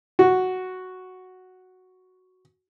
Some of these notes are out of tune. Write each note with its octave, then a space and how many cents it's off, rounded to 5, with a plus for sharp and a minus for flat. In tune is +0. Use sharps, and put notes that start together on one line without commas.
F#4 +0